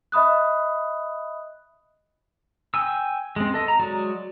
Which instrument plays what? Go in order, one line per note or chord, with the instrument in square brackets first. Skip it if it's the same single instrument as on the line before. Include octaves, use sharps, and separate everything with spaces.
[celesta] D#5 E5 B5 D#6 F#6
[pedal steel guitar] G5 G#5 E6
G#3 C4
A4 D#5
A#5
F#3 G#3 F#4 D5